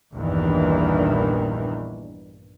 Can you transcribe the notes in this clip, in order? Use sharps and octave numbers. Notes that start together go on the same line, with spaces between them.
A#1 E2 G2 D#3 E3